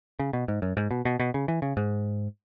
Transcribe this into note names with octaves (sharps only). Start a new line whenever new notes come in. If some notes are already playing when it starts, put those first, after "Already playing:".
C#3
B2
G#2
F#2
G#2
B2
B2
B2
C#3
E3
C#3
G#2